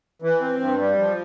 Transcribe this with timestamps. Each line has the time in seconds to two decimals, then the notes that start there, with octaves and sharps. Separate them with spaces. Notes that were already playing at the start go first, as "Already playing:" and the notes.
0.22 E3
0.41 C4
0.60 G2
0.79 G3
0.99 F3